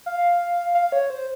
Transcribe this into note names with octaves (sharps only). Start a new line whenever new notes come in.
F5
F5
C#5
C5